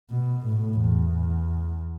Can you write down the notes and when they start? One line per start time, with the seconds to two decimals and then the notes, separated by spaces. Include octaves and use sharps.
0.11 B2
0.46 A2
0.82 E2